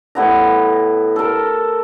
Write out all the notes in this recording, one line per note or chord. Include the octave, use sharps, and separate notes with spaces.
A2 B3 A#5
A4 A#4